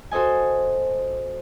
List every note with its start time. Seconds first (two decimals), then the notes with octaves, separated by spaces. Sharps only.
0.11 F#4 A4 C5 D#5 G#5